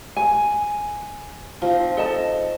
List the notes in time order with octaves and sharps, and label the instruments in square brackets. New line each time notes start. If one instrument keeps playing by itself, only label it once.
[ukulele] G#5
[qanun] F3 C4 D#4 [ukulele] F4
[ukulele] A4 D#5 A5